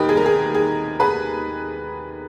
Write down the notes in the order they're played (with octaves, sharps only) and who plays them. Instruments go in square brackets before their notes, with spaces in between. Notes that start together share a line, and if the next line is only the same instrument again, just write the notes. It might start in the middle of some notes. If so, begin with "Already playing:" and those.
Already playing: [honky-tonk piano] D#2 G4 A#4 B4 D#5
G#4
A#4
G#4
G#4
G#4 B4